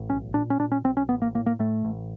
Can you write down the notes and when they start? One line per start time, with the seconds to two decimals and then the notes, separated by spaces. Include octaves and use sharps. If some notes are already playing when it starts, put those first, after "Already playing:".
Already playing: A1
0.09 B1 C#4
0.34 A#2 D4
0.50 C#4
0.59 A#2 D4
0.72 C#4
0.84 B1 C4
0.97 C#4
1.09 A1 B3
1.22 A#3
1.35 A2 A#3
1.46 A#3
1.59 A2 A3
1.85 A1